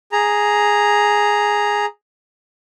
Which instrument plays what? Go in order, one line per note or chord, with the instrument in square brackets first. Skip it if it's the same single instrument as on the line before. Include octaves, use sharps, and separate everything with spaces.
[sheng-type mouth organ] G#4 A#5